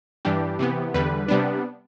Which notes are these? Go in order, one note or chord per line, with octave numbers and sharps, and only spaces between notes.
G2 E3 G3 D4 G4
C3 E3 B3
E2 D3 G3 B4
C3 G3 B3 D4